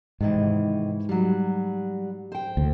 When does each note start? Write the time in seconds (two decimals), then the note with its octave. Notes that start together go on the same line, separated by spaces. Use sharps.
0.21 G#2 C3 D#3 E3
1.09 F#3 G3
2.32 C5 G5
2.57 D2